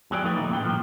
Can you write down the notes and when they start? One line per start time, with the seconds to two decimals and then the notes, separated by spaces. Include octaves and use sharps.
0.11 E2 F#3 G#4 D5 G5
0.24 F3 A3 D#4 A4 B4 C#5
0.36 D#2 A#2 D#4 E4
0.50 A2 C#3 E3 A3 G5
0.65 G2 A#2 F3